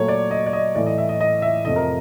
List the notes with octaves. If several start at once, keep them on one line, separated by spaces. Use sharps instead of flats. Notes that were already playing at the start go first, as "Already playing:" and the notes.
Already playing: A#2 F#3 A3 C#5
D5
D#5
D5
D#5
A2 E3 A3 D5
D#5
E5
D#5
D#5
E5
F2 C3 F3 A3 D#5
A#4